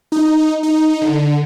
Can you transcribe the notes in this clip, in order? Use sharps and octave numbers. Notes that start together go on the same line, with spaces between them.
D#4
D#4
D3